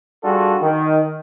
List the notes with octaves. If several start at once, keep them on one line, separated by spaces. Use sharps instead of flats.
G3 D4 F4 F#4 G#4 A4
D#3